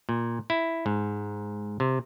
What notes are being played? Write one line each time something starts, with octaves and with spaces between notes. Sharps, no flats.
A#2
E4
G#2
C3